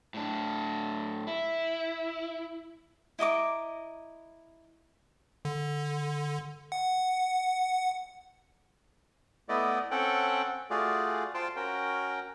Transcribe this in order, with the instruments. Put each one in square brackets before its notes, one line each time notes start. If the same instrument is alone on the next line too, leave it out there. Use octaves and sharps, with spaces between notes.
[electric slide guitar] A2 D4
E4
[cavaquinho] E4 D#5 A#5 D6
[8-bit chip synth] D3
F#5
[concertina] A3 B3 E4 D5 D#5
C4 C#4 A4 F#5 G5
A3 F4 F#4 G#4 D5
F4 C5 G5 A5 C6
C#4 F#4 A#4 G5